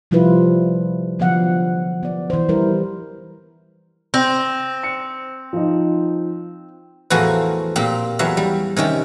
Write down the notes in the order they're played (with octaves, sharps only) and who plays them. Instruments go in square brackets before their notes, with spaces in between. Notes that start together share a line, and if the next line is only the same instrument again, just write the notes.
[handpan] C3 F3 G3 E4 F4 B4
D3 F3 F#3 B3 F5 F#5
B3 D5
E3 C5
G3 E4 A#4
[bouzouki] C4 [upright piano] A#6
[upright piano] C#7
F3 D#4
[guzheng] E2 A2 E3 F3 F#4 A#4
A#2 A#3 C4 G4
E2 F#3 E5 F5
G3
C3 D#3 C#4 G4